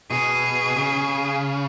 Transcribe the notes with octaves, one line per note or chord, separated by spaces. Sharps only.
B2 G#4
C#3